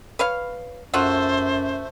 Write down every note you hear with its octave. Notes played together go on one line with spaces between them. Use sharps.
B4 C#5 F5
F#2 A3 F4 F#4 C5